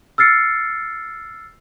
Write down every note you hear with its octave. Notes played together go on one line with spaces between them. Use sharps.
E6 F6 A6 C7 C#7